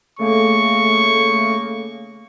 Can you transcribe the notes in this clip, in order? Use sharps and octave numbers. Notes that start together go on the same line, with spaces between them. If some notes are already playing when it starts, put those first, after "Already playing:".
C#3 A3 A#3 C#6